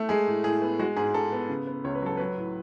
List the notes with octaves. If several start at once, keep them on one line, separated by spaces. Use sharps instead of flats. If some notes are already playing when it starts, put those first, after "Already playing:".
Already playing: A3
G#3 G#4
A2
A2 G#4
B3
G#3 F#4
G#2 G#4
G#2 A4
B3
C#3
B3
C#2 C#5
B4
F#3 A4
F#3 B4
A2